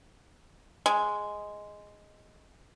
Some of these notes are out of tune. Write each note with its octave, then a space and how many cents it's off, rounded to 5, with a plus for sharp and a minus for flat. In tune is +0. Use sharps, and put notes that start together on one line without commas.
G#3 +0